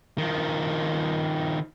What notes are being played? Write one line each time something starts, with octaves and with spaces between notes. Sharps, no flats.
D#3 F3